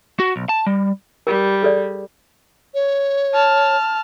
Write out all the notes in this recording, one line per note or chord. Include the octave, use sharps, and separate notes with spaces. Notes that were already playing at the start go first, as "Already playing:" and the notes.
F#4
B1
A5
G3
G3 A#4
G#4 A4 D5
C#5
A5 F6